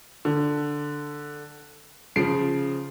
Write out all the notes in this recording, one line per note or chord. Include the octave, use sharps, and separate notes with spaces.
D3
C#3 F3 C7 D7